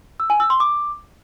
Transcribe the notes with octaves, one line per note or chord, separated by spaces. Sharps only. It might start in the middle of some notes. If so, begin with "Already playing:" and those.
E6
G#5
E6
C6
D6